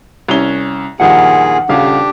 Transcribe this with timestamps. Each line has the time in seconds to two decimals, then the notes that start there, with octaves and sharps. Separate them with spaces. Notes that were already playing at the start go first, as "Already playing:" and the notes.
0.28 C2 C#4 G7
1.00 G2 A#2 D#3 F3 G#4 F#5
1.69 D#1 C#3 D4 G4 F5